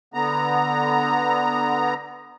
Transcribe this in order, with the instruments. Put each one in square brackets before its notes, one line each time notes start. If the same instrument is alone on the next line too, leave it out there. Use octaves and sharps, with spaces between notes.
[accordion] D3 B3 A#5